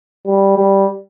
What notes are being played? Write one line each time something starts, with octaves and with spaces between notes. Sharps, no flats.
G3
G3